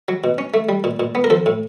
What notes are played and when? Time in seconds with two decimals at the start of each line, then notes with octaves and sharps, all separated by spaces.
0.08 F#3
0.24 B2
0.38 C#4
0.54 A3
0.69 G3
0.84 A#2
1.00 A#2
1.15 B3
1.24 A#4
1.30 F3 A4
1.46 A2